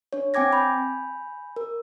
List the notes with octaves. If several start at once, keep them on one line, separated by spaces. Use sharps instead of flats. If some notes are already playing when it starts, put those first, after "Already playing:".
D4 C#5
C4 G5 G#5 D6 G#6 A#6
G#5 B5 G6
A#4